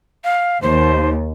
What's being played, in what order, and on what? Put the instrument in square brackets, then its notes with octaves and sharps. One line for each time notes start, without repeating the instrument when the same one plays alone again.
[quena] F5
[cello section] D#2 [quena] C5